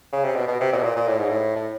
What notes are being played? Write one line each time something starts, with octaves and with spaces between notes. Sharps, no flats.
C#3
C3
B2
B2
C3
A#2
B2
A#2
A#2
A2
G#2
A2
A2